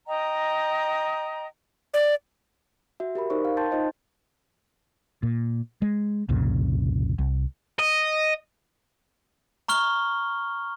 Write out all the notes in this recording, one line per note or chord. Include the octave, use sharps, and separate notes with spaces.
D#5 G5 A#5
D5
F#4 E5
G4 A#4 B5
D#4 A#4 C5 D5 C#6
F5
G5 A5 C6 G6 A6
D#4 F4 C5 D#5
A#2
G#3
C2 F2 A#2 C#3
C2
D#5
A#5 C#6 F6 G7